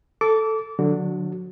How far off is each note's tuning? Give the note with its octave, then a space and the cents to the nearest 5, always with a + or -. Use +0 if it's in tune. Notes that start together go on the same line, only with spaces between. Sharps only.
A4 +0 D6 -25
D3 +0 F#3 -40 F#4 +0